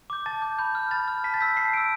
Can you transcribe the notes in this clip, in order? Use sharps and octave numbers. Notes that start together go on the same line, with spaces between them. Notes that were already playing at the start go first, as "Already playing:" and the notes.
D6 G6
A5 A6
D6 G6
B5 G6
F6
B5 A6
F6
A5 B6
A6
E6 G6 B6
A5 C7
E6 G6 D7